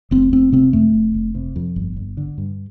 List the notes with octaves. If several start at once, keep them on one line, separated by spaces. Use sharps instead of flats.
F1 C4
F1 C4
C3 C4
F2 A3
F1
F1
C3
F2
G1
G1
D3
G2